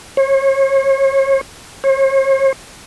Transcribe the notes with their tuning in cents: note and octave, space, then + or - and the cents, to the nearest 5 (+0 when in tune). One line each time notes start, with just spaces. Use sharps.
C#5 -35
C#5 -45